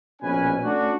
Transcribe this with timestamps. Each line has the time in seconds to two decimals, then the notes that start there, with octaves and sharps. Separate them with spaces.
0.22 A#1 B2 C#4 B4 G#5
0.64 A3 C#4 D4 F#4